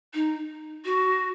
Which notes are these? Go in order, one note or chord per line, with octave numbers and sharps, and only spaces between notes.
D#4
F#4